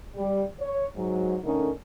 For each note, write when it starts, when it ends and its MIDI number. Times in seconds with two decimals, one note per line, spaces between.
0.16 0.43 55
0.60 0.84 73
0.95 1.36 44
0.95 1.36 54
1.44 1.69 50
1.44 1.69 57
1.44 1.69 61
1.44 1.69 63
1.44 1.69 70